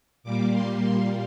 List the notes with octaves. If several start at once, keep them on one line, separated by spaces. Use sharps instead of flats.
A#2 G3 A#3 D6
C6
C6